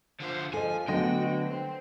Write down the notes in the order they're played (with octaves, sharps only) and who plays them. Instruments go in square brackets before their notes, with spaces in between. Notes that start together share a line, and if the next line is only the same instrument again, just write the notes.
[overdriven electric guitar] D3 C5 [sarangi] F3
[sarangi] F3 [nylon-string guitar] A4 D#5 [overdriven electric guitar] G#5
[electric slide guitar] D3 D#5 [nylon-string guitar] F#3 A3 B3 [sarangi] F#4 [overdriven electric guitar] G5
[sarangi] C4